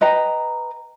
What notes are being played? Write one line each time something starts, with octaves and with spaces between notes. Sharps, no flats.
B4 D#5 G5 A#5